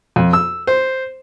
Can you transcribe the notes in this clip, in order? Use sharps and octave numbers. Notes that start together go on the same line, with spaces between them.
F2
E6
C5